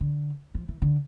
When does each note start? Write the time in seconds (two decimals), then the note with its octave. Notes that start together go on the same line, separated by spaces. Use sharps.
0.01 D3
0.55 F3
0.68 E3
0.82 D3